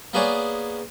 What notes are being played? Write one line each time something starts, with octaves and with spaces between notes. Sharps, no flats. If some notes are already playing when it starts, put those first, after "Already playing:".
A#3 B3 G#4 B4 C#5 D5